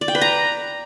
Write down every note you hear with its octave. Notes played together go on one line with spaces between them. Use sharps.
D5
G5
B4
A#5